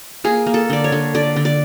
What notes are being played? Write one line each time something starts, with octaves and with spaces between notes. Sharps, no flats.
A#3 G#4
A#3
A4
D3 D5
C#5
D3
D3 D5
D3
D5